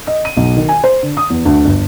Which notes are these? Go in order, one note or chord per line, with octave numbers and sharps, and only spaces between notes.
D#5
D#7
B1
D#3
G#5
C5
D3
D#6
E2
D2
G1